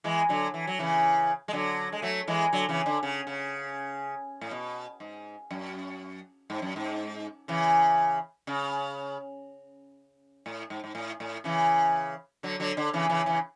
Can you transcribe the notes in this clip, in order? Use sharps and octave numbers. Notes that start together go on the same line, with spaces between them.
E3 G#3
D3 F#3
E3
F#3
C#3 E3
G#3
D3 F#3
G#3
F#3 A3
E3 G#3
D3 F#3
C#3 E3
D3
C#3
C#3
A2
B2
G#2
F#2
G#2
F#2
G#2
C#3 E3
C#3
A2
G#2
G#2
A2
A2
C#3 E3
D3 F#3
D3 F#3
D3
C#3 E3
C#3 E3
C#3 E3